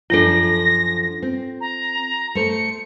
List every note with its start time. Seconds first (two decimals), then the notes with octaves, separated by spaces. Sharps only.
0.10 F#2 F3 D4 F4 A4 A#6
1.22 C4
1.60 A#5
2.35 A3 C5 C#7